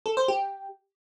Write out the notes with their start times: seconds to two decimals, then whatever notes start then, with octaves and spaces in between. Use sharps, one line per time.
0.06 A4
0.17 C5
0.28 G4